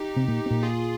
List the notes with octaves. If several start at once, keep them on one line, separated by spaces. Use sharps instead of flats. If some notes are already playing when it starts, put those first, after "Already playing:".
Already playing: D#4 G4
C3 C4
A#2 A#3
C4
A#2 A#3
F4 G#4